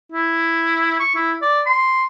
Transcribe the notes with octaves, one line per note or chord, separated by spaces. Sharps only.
E4
C#6
E4
D5
C6